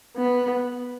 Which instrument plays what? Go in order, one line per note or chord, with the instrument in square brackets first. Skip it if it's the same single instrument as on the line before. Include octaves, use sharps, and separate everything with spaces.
[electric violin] B3